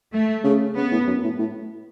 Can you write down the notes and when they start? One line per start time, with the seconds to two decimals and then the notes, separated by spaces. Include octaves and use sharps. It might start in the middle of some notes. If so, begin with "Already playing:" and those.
0.12 A3
0.44 C#3
0.75 C#3 B3
0.92 A2
1.07 F#2
1.23 A2
1.39 A2